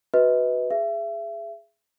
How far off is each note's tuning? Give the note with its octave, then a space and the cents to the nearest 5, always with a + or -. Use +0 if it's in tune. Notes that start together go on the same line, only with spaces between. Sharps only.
F#4 +0 B4 +0 D#5 +35
G#4 +0 E5 +30